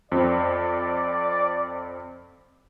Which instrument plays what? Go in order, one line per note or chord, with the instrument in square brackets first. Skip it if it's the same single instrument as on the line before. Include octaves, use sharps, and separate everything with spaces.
[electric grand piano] F2 C4 [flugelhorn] D5